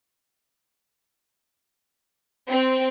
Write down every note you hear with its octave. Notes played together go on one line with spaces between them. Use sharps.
C4